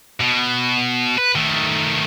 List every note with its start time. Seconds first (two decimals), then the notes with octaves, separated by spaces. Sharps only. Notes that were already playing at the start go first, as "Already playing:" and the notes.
0.21 B2
1.18 B4
1.36 D#3 A3